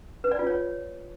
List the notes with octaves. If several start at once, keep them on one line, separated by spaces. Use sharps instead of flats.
B4
D5
F4
C#5